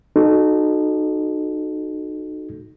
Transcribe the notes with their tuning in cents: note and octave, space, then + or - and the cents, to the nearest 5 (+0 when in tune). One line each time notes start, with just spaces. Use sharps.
D#4 -25 F#4 +0 A4 -20